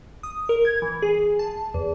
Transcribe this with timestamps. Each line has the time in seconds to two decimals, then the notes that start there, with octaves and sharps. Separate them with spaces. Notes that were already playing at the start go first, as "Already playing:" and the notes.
0.23 D#6
0.49 A#4
0.65 G#6
0.82 E3
1.02 G#4
1.39 A5
1.74 E2